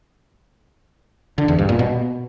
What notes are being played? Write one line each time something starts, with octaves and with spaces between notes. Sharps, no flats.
D3
E2
G2
A#2
B2